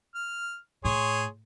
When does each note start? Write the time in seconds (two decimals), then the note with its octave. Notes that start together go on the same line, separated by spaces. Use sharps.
0.15 F6
0.85 A2 G#4 C#5 C6